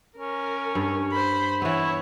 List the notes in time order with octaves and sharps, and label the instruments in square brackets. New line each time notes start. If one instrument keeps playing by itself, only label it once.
[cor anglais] C#4 [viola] A#4
[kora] G2
[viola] C5 B5
[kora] E3 B3 [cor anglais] E4 [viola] C#5